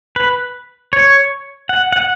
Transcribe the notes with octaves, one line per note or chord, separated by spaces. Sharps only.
B4
C#5
F#5
F#5